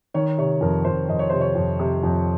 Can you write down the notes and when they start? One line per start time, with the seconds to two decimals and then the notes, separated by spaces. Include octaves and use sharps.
0.14 D#3 C#5
0.38 C3 C#5
0.61 F2 A#4
0.85 F2 C5
1.08 F2 D#5
1.19 C#5
1.30 C3 C5
1.41 C#5
1.55 F2
1.79 C3
2.03 F2